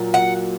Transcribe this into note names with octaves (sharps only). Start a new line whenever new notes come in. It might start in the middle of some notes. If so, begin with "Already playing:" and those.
Already playing: A#2 F#3
F#5